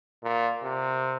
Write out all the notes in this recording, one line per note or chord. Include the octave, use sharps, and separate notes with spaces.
A#2
C3